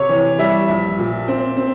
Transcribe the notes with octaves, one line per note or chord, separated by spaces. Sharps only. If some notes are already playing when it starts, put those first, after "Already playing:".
Already playing: C3 C#5
E3
G3 E5
A#1
A#2
C4
C4